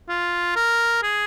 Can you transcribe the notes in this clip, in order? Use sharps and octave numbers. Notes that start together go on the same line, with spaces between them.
F4
A#4
G#4